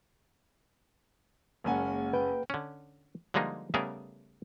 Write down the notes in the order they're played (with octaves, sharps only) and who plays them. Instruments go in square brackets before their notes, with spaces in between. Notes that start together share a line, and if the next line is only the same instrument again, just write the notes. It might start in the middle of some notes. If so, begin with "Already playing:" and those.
[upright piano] F#1 C#4 G#5 [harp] G#3 A#3 F#5
[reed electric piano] B4 [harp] G5
[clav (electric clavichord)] D3 C#4
D3 F3 G3 G#3 A#3 D#4
C#3 G3 A3 B3 G#4 A#4